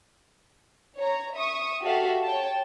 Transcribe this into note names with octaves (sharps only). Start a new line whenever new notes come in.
C#5 A#5
E5 C#6 D#6
F#4 G4 A4 E5 F5
C#5 G5 A5